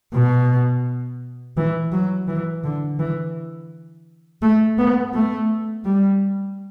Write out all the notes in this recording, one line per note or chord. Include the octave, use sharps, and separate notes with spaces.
B2
E3
F#3
E3
D3
E3
A3
B3
A3
G3